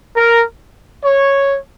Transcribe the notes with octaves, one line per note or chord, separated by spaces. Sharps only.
A#4
C#5